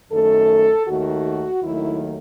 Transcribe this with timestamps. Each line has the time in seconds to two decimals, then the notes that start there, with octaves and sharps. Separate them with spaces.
0.11 F#2 D#3 A3 A4
0.87 D#2 D#3 A3 F#4
1.62 D#2 D#3 F#3 A3 E4